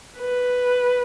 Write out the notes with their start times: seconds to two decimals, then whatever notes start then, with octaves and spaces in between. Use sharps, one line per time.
0.18 B4